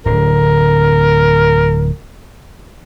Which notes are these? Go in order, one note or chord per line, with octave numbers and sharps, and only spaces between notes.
D1 D3 A#4